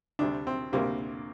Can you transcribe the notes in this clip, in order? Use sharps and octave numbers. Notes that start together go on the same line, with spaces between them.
D2 C3 G3 D4
C4
D2 C3 G3 A#3